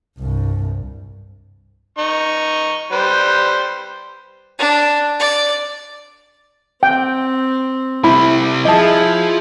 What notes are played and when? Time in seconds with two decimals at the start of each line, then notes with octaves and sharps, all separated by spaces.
0.18 C2 G2
1.98 D#4 C#6
2.92 G3 B4 C5
4.59 D4
5.20 D5
6.83 C4 G5
8.04 C3 G3 E4 B5
8.65 F3 E4 G#4 D#5 A5